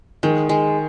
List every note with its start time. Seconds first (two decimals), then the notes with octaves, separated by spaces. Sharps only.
0.23 D#3 G#3
0.49 G#3